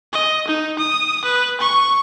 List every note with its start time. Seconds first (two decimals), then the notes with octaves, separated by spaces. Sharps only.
0.13 D#5
0.48 D#4
0.79 D#6
1.24 B4
1.60 C#6